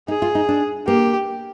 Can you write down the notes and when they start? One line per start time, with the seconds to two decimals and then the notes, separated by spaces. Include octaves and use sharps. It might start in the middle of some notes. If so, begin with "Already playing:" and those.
0.08 D#4 G#4
0.22 F4
0.35 D#4
0.49 D4
0.87 A#3 G4